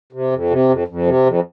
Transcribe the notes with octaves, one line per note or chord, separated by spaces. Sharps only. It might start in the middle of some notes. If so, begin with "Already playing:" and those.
C3
F2
C3
F2
F2
C3
F2